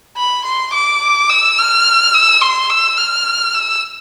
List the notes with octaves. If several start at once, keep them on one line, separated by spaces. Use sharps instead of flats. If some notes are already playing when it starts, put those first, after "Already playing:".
B5
C6
D6
E6
F6
E6
C6
E6
F6
E6